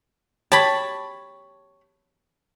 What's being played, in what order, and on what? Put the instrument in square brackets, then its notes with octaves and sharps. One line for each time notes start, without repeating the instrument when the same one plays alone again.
[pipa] G4 C#5 [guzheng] A5 B5